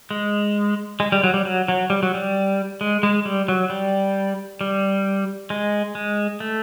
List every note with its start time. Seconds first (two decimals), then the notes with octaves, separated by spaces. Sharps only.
0.11 G#3
1.00 G#3
1.12 G3
1.24 F#3
1.34 G3
1.45 F#3
1.68 F#3
1.90 G3
2.03 F#3
2.14 G3
2.81 G#3
3.03 G#3
3.25 G3
3.48 F#3
3.70 G3
4.61 G3
5.50 G#3
5.95 G#3
6.40 A3